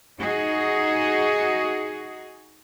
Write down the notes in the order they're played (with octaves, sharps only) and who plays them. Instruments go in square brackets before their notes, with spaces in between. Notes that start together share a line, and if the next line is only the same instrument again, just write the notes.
[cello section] D#4 F#4 G#4